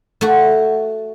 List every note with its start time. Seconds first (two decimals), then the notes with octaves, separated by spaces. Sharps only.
0.21 A3 F#4